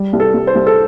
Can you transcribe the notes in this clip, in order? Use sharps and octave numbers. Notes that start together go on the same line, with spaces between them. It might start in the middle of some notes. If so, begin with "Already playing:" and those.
Already playing: G3
C2
A4
C2
C5
C2
A4